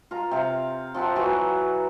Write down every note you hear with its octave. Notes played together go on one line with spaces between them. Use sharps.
F4 A#5
C3 F5
F3 C4 F#5 B5
E3 F#3 F#4 B4